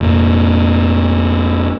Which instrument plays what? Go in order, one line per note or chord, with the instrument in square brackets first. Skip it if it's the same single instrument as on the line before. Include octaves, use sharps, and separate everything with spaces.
[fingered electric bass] F1 A#2